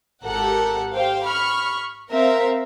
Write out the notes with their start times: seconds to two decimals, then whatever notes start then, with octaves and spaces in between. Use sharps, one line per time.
0.24 G#1 G4 A4 A#4 F#5
0.94 G4 C5 F5 G5
1.26 B5 C#6 F6
2.09 C4 A#4 E5 F5